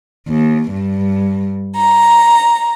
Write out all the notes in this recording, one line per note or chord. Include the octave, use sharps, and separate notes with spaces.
D#2
G2
A#5